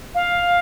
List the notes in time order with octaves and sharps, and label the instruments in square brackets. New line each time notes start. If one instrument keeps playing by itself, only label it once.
[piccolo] F5